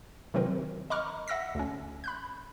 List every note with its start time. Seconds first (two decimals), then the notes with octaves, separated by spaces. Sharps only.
0.34 C3 D#3 F#3 C4 A#4 B4
0.90 D#5 A#5 B5 C#6 D6 F6
1.28 E5 F#5 E6 A#6 B6
1.55 D2 C#4
2.04 B5 F#6 G6